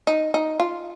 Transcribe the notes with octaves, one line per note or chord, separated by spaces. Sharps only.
D#4
D#4
F4